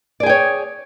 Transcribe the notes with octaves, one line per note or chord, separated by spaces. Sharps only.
G#4 C#5 D5 G5